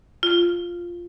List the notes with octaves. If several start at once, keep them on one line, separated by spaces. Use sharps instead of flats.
F4